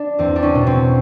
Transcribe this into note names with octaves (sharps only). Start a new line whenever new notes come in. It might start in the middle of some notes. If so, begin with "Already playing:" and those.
Already playing: D4
E2 C4
D4
C#4
B2
C4